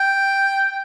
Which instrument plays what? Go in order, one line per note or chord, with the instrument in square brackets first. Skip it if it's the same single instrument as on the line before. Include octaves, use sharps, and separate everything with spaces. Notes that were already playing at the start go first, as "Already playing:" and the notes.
Already playing: [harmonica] G5